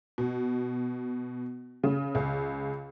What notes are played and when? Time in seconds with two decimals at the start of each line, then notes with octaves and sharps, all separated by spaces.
0.18 B2
1.84 C#3
2.15 C#2